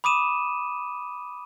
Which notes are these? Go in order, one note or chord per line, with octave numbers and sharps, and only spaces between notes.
B5 D6 D#6 D#7 E7